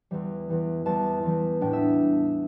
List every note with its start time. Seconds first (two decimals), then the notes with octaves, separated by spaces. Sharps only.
0.11 E2 E3 G3
0.49 E2 E3 G3
0.86 E2 E3 G3 A5
1.23 E2 E3 G3
1.61 A2 G3 B3 D4 G5
1.73 E5